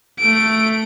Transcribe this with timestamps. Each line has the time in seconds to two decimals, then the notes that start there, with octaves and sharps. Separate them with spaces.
0.19 A3 D7